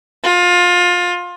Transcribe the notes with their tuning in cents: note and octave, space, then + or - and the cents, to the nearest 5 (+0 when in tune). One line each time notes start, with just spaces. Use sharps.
F4 +25